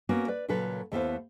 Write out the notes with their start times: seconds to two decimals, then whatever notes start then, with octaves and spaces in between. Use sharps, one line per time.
0.09 A#3 B3 C#4 F#4 A#4
0.28 B4 D5
0.48 A#2 C#3 F#3 A4 B4
0.92 D#2 A3 B3 E4 C5 F5